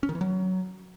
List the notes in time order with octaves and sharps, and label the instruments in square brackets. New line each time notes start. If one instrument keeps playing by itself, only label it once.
[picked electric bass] C#4
D#3
E3
F#3